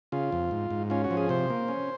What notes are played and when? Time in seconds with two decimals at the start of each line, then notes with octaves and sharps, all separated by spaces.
0.12 C#3 F4
0.32 F2
0.51 G#2
0.71 G#2
0.90 C#4 F4
1.04 F#4
1.11 F3
1.17 G#4
1.29 C3 C5
1.50 A#3
1.68 C#4